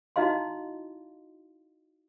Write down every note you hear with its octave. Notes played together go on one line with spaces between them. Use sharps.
D#4 E4 F#4 D#5 F5 C6